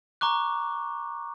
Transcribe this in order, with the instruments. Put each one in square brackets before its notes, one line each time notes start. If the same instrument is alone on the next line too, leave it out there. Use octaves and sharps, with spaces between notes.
[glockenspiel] A#5 C#6 D6 F#6